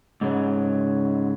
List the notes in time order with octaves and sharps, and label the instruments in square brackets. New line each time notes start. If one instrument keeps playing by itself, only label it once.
[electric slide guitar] G#2 C#3 F#3